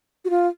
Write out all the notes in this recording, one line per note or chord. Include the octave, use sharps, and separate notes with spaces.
F#4
F4